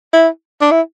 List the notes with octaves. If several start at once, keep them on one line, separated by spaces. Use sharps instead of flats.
E4
D4
E4